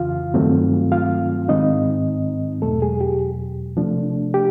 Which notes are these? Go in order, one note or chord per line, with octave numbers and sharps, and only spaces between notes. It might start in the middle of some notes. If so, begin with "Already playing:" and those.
Already playing: F2 C#3 E3 F4 F5
G2 D#3 F#3 A3 C4
F4 F5
G#2 D#3 G#3 C4 D#4 D#5
E2 B2 F#3 A3 A4
G#3 G#4
G4
C3 F3 A3 D4
G4